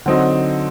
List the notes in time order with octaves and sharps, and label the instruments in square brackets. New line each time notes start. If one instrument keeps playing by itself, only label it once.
[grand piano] D3 F#3 C4 D#4